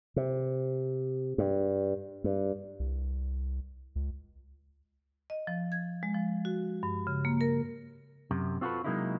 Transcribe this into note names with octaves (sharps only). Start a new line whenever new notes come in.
C3
G2
G2
C2
C#2
D#5
F3
G#6
G#3
F3
F#4
G2
C#3
A#3
A#4
F#2 C3
C4 F4 F#4 G#4 A4 B4
C3 F#3 G#3 A#3 D#4 E4